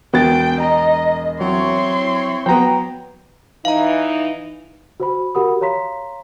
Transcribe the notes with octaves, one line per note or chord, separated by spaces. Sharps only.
E1 B3 F#4 G5 A6
D#5 A#5
F#3 C4 E4 C#5 C6
F#3 B3 G5 A#5
E3 D#4 F5 A#5
F#4 C5 B5
F#4 G4 A#4 F#5 B5 D#6
C#5 F5 A#5 C6 B6